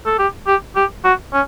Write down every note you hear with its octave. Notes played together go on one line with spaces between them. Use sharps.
A4
G4
G4
G4
F#4
C#4